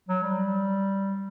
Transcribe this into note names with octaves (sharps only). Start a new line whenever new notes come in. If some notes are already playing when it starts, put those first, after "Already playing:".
F#3
G3